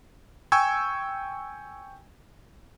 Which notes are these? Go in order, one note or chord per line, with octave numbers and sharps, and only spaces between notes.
G5 G#5 C#6 E6 G#6